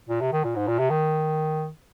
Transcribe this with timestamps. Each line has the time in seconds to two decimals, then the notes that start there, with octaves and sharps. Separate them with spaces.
0.09 A#2
0.21 C3
0.33 D#3
0.44 A#2
0.56 G#2
0.67 A#2
0.79 C3
0.90 D#3